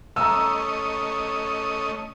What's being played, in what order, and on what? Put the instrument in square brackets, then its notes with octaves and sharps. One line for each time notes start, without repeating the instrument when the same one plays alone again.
[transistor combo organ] A3 C#4 D#5 [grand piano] A#5 E6